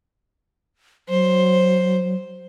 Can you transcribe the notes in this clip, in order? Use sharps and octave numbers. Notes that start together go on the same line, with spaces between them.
F#3 C5